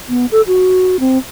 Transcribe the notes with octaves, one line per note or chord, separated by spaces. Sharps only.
B3
A4
F#4
C4